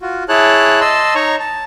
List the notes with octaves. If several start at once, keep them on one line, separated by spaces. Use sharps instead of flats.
F4 F#4
E4 G#4 C#5 A5 F#6
D#5 A5 C6 E6
D#4 C#5 A#5 C#6
A5